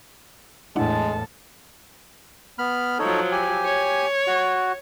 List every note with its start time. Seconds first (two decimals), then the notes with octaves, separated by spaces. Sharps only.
0.76 E2 A2 G#3 D4 E4 A4 F#5 A5
2.59 B3 B5 F6
2.99 F3 F#3 D#4 A4 C#5
3.32 G4 G#5
3.65 C#5
4.27 F#4